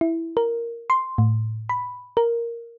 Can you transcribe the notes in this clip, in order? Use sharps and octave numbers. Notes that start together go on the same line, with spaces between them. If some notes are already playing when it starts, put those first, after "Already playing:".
E4
A#4
C6
A2
B5
A#4